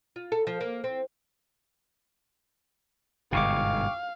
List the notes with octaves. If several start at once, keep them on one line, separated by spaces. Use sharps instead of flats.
F4
A4
F3
A#3
C4
G1 G#2 B2 F5 G5 C#6 D6